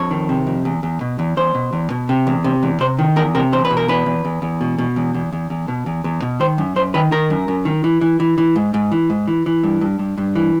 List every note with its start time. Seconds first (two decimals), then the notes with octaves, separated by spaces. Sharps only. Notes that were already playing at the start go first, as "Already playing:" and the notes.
Already playing: F2 C#5
0.11 D#3
0.29 C3
0.47 F2
0.65 E2
0.83 E2
1.01 B2
1.19 E2
1.37 E2 C5
1.55 B2
1.73 E2
1.90 B2
2.09 C3
2.27 E2
2.44 C3
2.63 E2
2.80 C3 C5
2.99 D#3
3.16 E2 A#4
3.35 C3 A#4
3.52 E2 C5
3.65 B4
3.70 B2
3.77 A#4
3.88 E2 B4
4.06 E2
4.25 E2
4.42 E2
4.61 B2
4.79 B2
4.96 E2
5.14 E2
5.33 E2
5.50 E2
5.68 B2
5.86 E2
6.04 E2
6.22 B2
6.40 D#3 C5
6.58 F#2
6.76 F#2 C5
6.94 D#3 B4
7.12 D#3 A#4
7.30 F#2
7.48 F#2
7.65 D#3
7.84 E3
8.01 E3
8.20 E3
8.38 E3
8.56 G#2
8.74 G#2
8.92 E3
9.10 G#2
9.28 E3
9.46 E3
9.63 G2
9.81 G2
9.99 G2
10.18 G2
10.36 E3